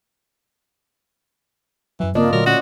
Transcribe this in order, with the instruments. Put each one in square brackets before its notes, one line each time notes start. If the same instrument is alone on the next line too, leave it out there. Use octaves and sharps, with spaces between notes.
[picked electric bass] F#2 F#3 [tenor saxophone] E3
[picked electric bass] G1 C#3 C4 [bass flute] A#3 [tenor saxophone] D4 [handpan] F4 D5 D#5
[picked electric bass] A#2 D3 A3 [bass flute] F#3 [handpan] A#3 [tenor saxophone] A#4
[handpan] C#4 [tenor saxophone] F#4 [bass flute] D5